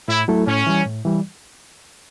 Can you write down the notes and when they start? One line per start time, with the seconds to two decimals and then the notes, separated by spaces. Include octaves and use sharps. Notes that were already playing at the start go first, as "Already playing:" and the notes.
0.08 A2 E4
0.28 F#3 A3 E4 A4
0.47 A2 C#4
0.67 E3 G3
0.86 A2
1.05 E3 G3